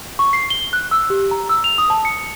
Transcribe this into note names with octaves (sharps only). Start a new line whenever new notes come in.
C#6
C7
G7
F#6
E6
G4
A#5
E6
F7
D#6
A5
C#7